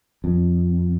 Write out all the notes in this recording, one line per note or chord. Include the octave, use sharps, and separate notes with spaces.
F2